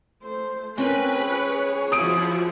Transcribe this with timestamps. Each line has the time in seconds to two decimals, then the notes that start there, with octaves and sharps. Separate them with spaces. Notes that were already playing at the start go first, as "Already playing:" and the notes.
0.23 A3 C5
0.78 C4 C#4 A#4 B4 G5 G#5
1.21 G#4 C#5
1.92 F3 E4 F#4 D#6 D7